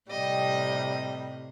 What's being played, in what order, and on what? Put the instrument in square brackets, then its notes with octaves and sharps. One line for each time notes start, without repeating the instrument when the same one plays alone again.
[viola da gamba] A2 C3 [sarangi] G3 [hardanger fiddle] D#5